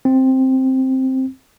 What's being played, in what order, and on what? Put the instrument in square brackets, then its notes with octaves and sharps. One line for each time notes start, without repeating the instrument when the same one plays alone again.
[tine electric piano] C4